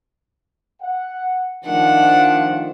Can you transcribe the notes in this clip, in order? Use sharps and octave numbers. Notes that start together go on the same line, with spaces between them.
F#5
D#3 F3 A3 D4 F#5